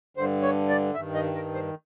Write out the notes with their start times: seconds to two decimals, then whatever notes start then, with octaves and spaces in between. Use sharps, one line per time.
0.17 G2 D3 C5
0.43 C#5
0.69 D5
0.95 G2 D#3 E5
1.15 D#5
1.35 A#4
1.54 C5